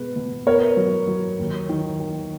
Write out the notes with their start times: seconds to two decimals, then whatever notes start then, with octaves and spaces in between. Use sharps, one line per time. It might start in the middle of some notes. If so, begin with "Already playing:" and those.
Already playing: B2 G#3 B4
0.16 B2
0.46 B3 A#4 C#5
0.77 F#3
1.08 F#3
1.39 D#2
1.69 D#3
2.00 D#3